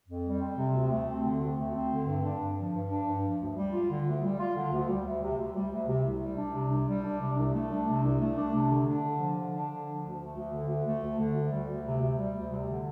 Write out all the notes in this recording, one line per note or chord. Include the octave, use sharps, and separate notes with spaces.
F2
G3
C4
C3
D2
A3
C4
D3
D2
A3
C4
D3
G2
D4
G2
F3
G2
D4
G2
F3
D2
G3
F4
D3
D2
G3
F4
D3
D2
G3
D2
C3
D2
G3
D2
C3
C2
G3
D4
C3
C2
G3
D4
C3
C2
A3
D4
C3
C2
A3
D4
C3
D3
D4
D3
F3
D3
D4
D3
F3
D2
A3
D2
D3
D2
A3
D2
D3
D2
G3
D2
C3
D2
G3
D2
C3
D3